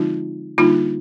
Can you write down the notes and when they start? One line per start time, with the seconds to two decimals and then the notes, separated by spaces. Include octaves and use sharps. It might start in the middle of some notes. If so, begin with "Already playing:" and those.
Already playing: D3 F3 G#3 C4 D#4 F4
0.58 D3 G3 A#3 D4 D#4 F4